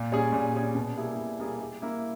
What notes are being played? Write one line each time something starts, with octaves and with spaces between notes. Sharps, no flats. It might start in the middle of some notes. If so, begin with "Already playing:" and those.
Already playing: A#2
G3 C#4 G#4
A#2
G3 C#4 G#4
B2
G3 A#3 E4 G#4
B2
G3 A#3 E4 G#4
G3
A#3 E4